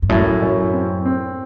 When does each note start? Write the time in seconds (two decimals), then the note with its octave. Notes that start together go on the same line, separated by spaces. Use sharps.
0.02 G2
0.09 F#2 A2
0.42 F#2
0.73 C4
1.05 C4